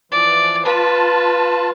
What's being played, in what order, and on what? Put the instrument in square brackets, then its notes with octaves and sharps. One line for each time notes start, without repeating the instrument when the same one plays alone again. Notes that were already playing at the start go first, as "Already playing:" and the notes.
[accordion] E3 F3 [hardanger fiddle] D5
[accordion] F4 A5 [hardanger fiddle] B4